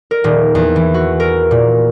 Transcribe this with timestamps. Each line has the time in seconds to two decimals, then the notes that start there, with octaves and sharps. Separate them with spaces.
0.11 A#4
0.24 D#1
0.55 E2
0.76 E3
0.94 F#4
1.20 A#4
1.51 A#2